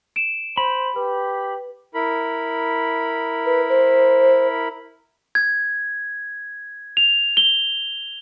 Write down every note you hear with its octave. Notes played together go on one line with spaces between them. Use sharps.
D7 E7
C5 B5
G4 B4
E4 A#4 B5
B4
C5
G#6
F7
G7